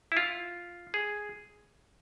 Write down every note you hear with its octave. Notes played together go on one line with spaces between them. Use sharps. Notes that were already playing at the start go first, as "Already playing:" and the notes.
E4
F4
G#4